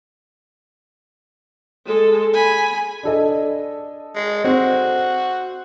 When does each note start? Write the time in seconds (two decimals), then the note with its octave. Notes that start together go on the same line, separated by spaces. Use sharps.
1.86 G#3 A4
2.34 G#5 B5
3.03 D4 A4 D#5
4.15 G#3
4.44 C4 F#4